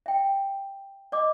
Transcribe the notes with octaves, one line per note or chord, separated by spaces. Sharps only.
E5 G5
D5 D#5 D6